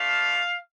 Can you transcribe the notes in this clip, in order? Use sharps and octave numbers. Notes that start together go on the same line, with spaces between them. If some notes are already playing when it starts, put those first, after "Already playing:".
Already playing: A3 D4 F4 F5